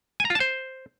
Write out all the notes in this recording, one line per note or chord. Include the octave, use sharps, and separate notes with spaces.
G#5
A#5
F4
A5
C5